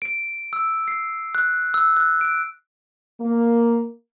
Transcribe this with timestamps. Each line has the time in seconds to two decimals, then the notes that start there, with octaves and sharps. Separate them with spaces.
0.02 D7
0.53 E6
0.88 C7
1.35 F#6
1.74 E6
1.97 F#6
2.21 D7
3.21 A#3